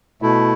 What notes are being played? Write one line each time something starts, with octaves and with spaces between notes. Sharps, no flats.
B2 A3 E4